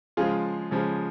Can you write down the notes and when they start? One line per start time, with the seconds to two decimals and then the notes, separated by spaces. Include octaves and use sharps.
0.17 C#3 F3 G#3 F4 G#4
0.71 C#3 F3 G#3